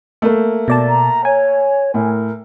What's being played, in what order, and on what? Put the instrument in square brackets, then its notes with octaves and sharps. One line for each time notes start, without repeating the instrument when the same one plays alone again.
[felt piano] A3 A#3
[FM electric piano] B2 D5 A5
[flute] A#5
[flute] C#5 [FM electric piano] G#5
[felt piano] A2 [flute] A#4